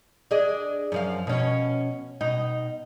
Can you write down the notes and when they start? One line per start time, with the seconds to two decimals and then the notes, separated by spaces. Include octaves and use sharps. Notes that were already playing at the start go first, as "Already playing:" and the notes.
0.31 D4 G#4 D#5
0.92 F#2 F3 F5
1.27 B2 C#4
2.21 B2 D#4